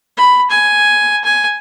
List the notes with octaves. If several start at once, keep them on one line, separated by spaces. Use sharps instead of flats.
B5
G#5
G#5